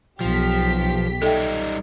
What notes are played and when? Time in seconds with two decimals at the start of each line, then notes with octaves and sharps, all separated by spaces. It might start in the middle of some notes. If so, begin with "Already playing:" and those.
0.21 B1 F3 G4 B6
1.22 G3 D#4 A4 E5 G5